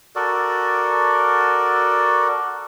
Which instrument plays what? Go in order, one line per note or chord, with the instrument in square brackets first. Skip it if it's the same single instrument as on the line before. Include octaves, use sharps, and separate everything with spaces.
[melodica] F#4 A4 A#4 D5